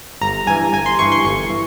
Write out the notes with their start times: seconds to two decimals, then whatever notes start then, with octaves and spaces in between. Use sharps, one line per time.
0.21 G1 A#5
0.47 G2 E3 G#5
0.73 G1 G#5
0.86 C6
0.99 G2 E3 C#6
1.12 C6
1.25 G1 C#6
1.50 E3